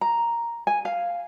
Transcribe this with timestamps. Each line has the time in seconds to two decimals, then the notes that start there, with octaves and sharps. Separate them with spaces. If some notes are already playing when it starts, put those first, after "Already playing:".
0.01 A#5
0.67 G#5
0.85 F5